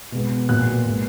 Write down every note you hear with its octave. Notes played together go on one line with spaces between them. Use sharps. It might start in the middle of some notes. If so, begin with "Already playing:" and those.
B2 G#3 B3
A#2 F#3 B3 F#6
A#2 G#3 B3